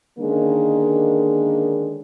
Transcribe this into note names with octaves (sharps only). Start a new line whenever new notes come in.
D3 D#3 G#3 A#3 C#4 D4